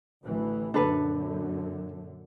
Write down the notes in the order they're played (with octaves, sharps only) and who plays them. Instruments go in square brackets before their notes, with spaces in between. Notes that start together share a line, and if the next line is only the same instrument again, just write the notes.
[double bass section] A1 D2 E3
[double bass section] F#2 A#2 D3 [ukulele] D4 A4 B4